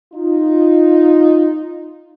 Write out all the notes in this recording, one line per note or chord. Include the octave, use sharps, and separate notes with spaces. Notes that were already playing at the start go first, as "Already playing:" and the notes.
D#4 F4